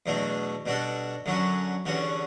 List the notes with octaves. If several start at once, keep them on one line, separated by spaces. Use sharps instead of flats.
E2 B2 F#3 A3 D4
B2 G3 D4 F#4 A4
F#2 D3 F#3 C#4 F#4
E2 D3 G3 C#4 F#4